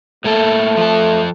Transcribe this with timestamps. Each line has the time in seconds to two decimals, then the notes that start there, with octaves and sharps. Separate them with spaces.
0.24 A2 A3 A#3 A4
0.77 F3 A4